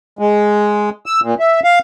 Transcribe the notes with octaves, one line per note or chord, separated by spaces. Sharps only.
G#3
E6
A#2
E5
F5